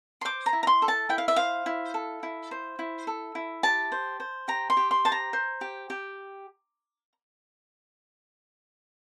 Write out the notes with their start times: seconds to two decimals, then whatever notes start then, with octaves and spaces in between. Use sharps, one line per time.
0.21 C6
0.25 C5 D6
0.46 A#5
0.53 E4
0.63 A#5
0.67 C6
0.82 A4
0.88 A5
1.09 E4 G5
1.18 F5
1.28 E5
1.36 C5 F5
1.66 E4
1.94 A4
2.23 E4
2.51 C5
2.79 E4
3.07 A4
3.35 E4
3.63 G4 A5
3.92 C5
4.20 C5
4.48 G4 A#5
4.70 C6
4.77 G4
4.91 C6
5.05 C5 A5
5.12 A#5
5.33 C5
5.61 G4
5.90 G4